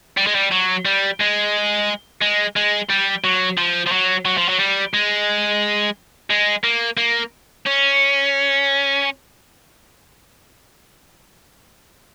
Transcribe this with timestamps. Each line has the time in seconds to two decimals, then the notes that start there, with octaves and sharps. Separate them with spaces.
0.17 G3
0.27 G#3
0.35 G3
0.52 F#3
0.85 G3
1.20 G#3
2.22 G#3
2.56 G#3
2.90 G3
3.24 F#3
3.57 F3
3.87 F3
3.92 F#3
4.25 F#3
4.37 F3
4.49 F#3
4.59 G3
4.94 G#3
6.30 G#3
6.64 A#3
6.97 A#3
7.66 C#4